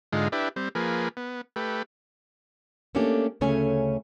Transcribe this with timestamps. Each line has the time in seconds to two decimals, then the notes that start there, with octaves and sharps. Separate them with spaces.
0.13 G#2 D3 G#3 D#4 F4
0.32 D4 E4 G4 B4
0.56 G3 C4
0.75 F3 A#3 G#4 B4
1.17 B3
1.56 A3 G4 B4
2.95 A3 A#3 C#4 D4 G4
3.41 D2 C#3 A3 C#4 C#5 G#5